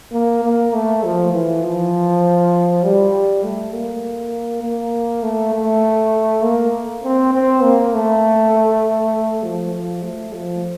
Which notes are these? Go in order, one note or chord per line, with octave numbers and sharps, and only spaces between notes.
A#3
A#3
A3
F3
E3
F3
G3
A3
A#3
A#3
A3
A3
A#3
C4
C4
A#3
A3
F3
F3
A3
F3